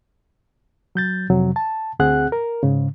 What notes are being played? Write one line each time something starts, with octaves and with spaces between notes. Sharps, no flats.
F#3 G6 A6
F2 C3 F#3
A5
D2 C4 G#4 F#5 F#6
A#4
G#2 C#3